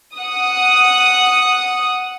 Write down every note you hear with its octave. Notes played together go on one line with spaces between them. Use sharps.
F#5 D#6